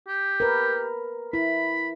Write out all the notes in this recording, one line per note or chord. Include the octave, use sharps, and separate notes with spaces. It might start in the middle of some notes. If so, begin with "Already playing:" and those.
G4
A#4 B4
E4 B5